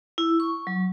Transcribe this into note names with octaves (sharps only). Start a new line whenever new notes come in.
E4
C#6
F#3